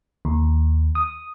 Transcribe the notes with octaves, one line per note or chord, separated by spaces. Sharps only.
D#2
D#6